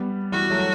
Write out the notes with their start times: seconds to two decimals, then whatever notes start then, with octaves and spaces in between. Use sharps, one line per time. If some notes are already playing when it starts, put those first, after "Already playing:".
Already playing: G3 B3
0.32 E3 G3 F#4
0.50 F#3 A3